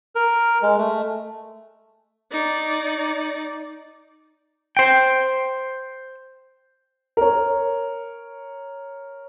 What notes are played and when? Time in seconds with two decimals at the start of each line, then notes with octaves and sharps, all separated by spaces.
0.16 A#4
0.62 G#3
0.78 A3
2.31 D#4 D5
4.77 C5 G5
7.17 A#4 C#5